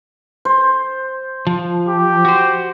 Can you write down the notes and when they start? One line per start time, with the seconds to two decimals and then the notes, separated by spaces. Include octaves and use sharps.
0.45 C5
1.47 F3
1.89 G4
2.25 F#4 C5